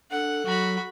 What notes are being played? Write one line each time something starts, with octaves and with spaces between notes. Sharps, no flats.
D4 A4 F#5
F#3 F#4 B5